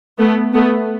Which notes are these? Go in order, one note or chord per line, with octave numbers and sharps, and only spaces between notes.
A3 B3
A3 B3